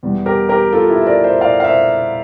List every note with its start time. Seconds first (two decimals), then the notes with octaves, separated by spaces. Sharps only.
0.03 E2 E3 G3
0.26 G4 A#4
0.49 G4 A#4
0.72 F4 A4
0.90 E4 G4
1.02 E5
1.07 A#4 D5
1.24 C5 E5
1.41 D5 F5
1.60 F5
1.64 C5 E5